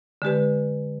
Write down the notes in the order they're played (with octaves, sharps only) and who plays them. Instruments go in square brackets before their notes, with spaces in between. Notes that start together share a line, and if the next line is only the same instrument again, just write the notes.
[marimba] D3 G#3 G4 B4